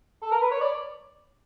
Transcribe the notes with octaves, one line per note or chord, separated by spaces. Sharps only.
A4
A#4
B4
C#5
D5